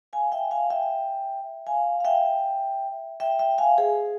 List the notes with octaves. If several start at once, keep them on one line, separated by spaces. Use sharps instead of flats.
F5 G#5
E5 G5
F5 G#5
E5 G5
F5 G#5
F5
E5 G5
E5 G5
E5 G5
F5 G#5
G#4 C5